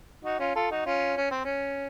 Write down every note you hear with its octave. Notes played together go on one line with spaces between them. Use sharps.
D#4 F#4
C#4 F4
F4 A4
D#4 F#4
C#4 F4
C#4
C4
C#4